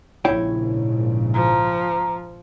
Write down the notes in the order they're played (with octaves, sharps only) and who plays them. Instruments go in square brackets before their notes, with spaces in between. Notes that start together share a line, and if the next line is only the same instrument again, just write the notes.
[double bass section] A#1 G#2 C#3 [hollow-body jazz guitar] E4 C#5 G5
[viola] F3 [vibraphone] A#5